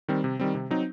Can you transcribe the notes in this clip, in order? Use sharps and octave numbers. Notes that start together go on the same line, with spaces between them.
D#3 G3 C4
C3
D#3 G3 C4
C3
F#3 C4 D#4